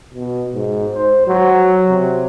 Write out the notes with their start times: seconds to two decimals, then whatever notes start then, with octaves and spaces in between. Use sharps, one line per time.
0.14 B2
0.54 G#2
0.95 C5
1.27 F#3
1.89 C3